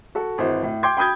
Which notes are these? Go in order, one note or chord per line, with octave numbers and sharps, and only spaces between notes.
F#4 A4
G#1 E3 C5
A2
G5 C6 D6 G6 G#6
G5 B5 D#6 G6 G#6